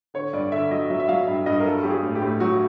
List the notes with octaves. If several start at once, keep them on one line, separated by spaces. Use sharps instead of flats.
D3 C#5
G2 D5
D3 E5
F#3 D#5
F#3 E5
E5
F#3 F5
G2 E5
G2 D#5
A#4
F#3 A4
F#3 G4
G#4
A2
G4
A2
F#3 F#4